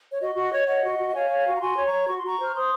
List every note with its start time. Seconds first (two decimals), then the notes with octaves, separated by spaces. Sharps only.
0.11 C#5
0.21 F#4 D#5
0.36 F#4
0.52 C#5
0.67 C#5 D#5 F#5
0.84 F#4
0.99 F#4
1.09 F#5
1.15 C#5 F5 G#5
1.30 C#5
1.46 F#4
1.56 A#5
1.61 F#4 G#5 C6
1.77 C#5
1.84 A#5 C#6
1.93 C#5
2.08 F#4 C#6
2.16 C6
2.24 F#4 A#5 C#6
2.39 C5 F6
2.55 C5 C6 D#6